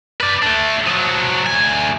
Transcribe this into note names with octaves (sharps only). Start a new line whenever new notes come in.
B4 D5
A3 D4
F3 F#3
D2 G#5